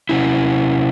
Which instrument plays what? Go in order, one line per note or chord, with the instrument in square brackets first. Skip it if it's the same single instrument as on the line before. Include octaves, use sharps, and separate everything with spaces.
[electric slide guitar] C3 C#4 E4